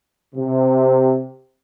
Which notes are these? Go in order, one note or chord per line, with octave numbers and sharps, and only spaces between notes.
C3